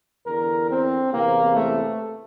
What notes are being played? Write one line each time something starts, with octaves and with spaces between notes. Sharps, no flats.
E2 D3 A#4
C4
E2 C3 E3 A#3
A3